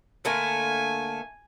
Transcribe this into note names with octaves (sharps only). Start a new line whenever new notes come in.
D3 A3 A#3 G#5